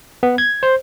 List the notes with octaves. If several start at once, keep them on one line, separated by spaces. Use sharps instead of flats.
B3
G#6
C5